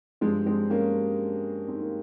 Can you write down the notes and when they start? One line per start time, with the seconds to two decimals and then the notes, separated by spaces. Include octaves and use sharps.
0.21 G2 F3 G#3 C4
0.46 G#3 C4
0.70 A#3 C#4
1.68 C4 D#4
1.82 A#3